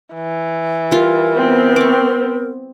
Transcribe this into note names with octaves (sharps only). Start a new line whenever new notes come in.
E3
G3 F4 A#4
B3 C4
C#6 D6